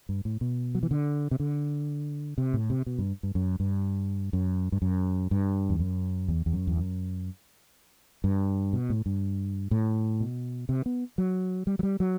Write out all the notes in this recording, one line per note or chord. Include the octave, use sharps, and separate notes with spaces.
G2
A2
B2
F#3
E3
D3
C3
D3
C3
A2
C3
B2
G2
G2
F#2
G2
F#2
G2
F#2
G2
E2
F#2
E2
E2
F#2
E2
F#2
G2
B2
A2
G2
A2
B2
C3
B3
F#3
G3
F#3
G3
F#3